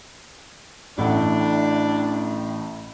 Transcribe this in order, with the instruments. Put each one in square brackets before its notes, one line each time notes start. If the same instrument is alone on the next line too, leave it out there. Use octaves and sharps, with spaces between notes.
[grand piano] A1 A2 F#5 [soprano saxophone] D4